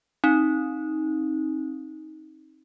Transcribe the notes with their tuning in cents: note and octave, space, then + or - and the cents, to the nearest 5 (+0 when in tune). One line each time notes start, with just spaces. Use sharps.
C4 +40 D#4 +15